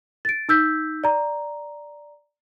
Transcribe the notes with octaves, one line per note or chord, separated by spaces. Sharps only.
A6 D7
D#4 E6 G6 B6
D5 A#5